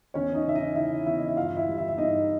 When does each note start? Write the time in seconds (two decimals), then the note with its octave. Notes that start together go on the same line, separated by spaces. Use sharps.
0.14 E2 C#4 C#5
0.35 D#4 D#5
0.45 C#3 E5
0.55 D#4 D#5
0.75 C#3 E4 E5
1.06 E2 E4 E5
1.18 D#5
1.28 E5
1.36 G2 F4 F5
1.56 E4 E5
1.68 G3
1.78 E4 E5
1.88 E5
1.98 G2 D#4 D#5